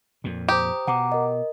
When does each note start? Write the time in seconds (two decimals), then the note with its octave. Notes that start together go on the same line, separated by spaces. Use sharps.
0.24 F2 A#2
0.49 G4 C5 A#5 D#6
0.87 B2 F#5 A#5 D6
1.12 A#4 D#5